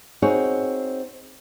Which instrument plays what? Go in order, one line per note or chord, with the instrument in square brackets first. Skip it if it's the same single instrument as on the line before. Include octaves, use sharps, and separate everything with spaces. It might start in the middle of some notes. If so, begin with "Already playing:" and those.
[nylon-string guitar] C4 D#4 F#4 G#4 C#5